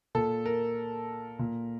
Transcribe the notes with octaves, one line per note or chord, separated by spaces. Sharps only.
A#2 A4
A#4
A#2